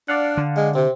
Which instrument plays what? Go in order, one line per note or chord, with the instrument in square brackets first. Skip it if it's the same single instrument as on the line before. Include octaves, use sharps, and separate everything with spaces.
[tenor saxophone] D4 [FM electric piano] D5 F5 F#5
[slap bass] D3
[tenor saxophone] G#3
[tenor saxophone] C3 [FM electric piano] C4